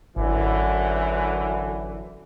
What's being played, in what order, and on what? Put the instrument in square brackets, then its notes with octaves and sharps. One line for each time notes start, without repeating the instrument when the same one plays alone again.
[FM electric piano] G#1 [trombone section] F#2 D3 E3